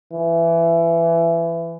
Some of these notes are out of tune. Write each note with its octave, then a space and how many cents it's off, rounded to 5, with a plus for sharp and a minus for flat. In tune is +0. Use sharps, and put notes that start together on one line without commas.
E3 +20